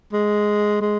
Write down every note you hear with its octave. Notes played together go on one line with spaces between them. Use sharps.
G#3
G#3